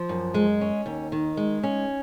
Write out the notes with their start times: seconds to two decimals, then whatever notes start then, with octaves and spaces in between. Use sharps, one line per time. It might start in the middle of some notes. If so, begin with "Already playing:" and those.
Already playing: F3
0.09 F#2
0.34 G#3
0.61 C#4
0.86 D#2
1.12 D#3
1.37 G#3
1.63 C#4